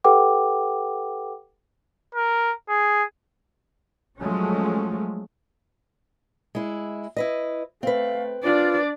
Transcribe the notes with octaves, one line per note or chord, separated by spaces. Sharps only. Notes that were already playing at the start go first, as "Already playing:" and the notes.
G4 A4 B4 F#5 G5 D6
A#4
G#4
F3 F#3 G#3 A3 C#4
G#3 E4
E4 B4 D#5
A3 C4 B4 F5
D4 F4 D5